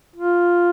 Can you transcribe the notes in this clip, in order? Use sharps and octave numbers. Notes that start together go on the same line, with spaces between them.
F4